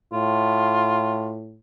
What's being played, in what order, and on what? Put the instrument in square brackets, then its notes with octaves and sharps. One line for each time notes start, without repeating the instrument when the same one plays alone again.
[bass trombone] A2 [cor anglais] F4